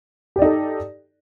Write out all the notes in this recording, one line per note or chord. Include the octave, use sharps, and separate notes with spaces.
D#4 G4 A4 D5